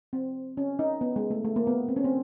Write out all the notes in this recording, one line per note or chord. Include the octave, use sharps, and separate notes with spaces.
C4
C#4
D#4
B3
G#3
A3
A3
A#3
B3
C4
C#4
C4